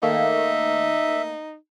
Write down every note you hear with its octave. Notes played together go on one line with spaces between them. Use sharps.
D#3 A3 A#3 D#4 E5